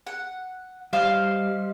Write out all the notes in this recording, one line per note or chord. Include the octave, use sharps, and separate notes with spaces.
F#5
G3 C5 D#5 F5